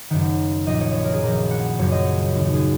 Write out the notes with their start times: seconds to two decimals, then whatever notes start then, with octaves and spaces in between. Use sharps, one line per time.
0.10 F#1 F#2 D#3 F#5
0.67 A#1 A#2 D#5
0.81 C#5
0.95 C#5
1.04 A#4
1.14 G#4
1.23 A#1 A#2 A#4
1.51 F#5
1.79 F#1 F#2 C#3 C#5
1.92 D#5
2.04 C#5
2.35 D#2 D#3
2.45 F#4
2.54 G#4